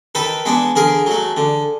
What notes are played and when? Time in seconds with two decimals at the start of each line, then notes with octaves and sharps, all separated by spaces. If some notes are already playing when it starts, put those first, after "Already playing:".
0.15 D#3 A4 B4
0.46 G#3 B3 D4
0.76 D3 G#4 A#4
1.06 F#3 A3
1.37 D3